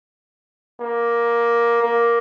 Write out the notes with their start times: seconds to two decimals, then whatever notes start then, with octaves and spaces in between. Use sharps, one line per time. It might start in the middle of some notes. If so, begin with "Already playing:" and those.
0.80 A#3
1.82 A#3